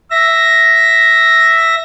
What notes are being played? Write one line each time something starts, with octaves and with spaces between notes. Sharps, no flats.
E5 A#6